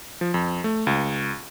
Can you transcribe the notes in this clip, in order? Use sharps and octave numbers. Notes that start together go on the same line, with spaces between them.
F3
F2
A3
C#2